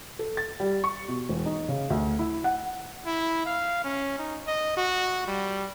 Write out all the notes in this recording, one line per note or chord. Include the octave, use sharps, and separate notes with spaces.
A4
A6
G3
C#6
B2
E1
D#4
C#3
D2
E4
F#5
E4
F5
C#4
D#4
D#5
F#4
G3